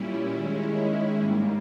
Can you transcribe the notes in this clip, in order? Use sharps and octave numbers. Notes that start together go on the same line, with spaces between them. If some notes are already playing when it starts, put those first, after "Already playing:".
Already playing: A#2 G3 C#4 E4
D#3 G#3 C#4 E4
G#2 G3 A#3